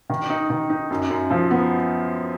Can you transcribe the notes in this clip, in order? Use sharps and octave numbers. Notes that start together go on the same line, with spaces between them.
D#3
D#4
D#3
D#4
F#2
F#2
F3
B3